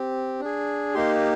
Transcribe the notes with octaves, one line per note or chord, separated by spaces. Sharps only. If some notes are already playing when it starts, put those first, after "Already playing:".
Already playing: C4 G4
D4 G#4
A#3 D#4 G4 C6